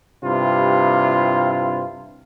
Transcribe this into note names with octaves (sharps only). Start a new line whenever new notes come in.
G2 C3 E4 F4